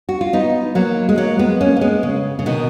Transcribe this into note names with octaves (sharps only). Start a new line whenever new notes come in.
F#4
F4
B3 D#4
F#3 A#3
G#3
F#3 A#3
G#3 B3
A#3 C#4
A#3
G#3 B3
C#3
C#3
B2 D#3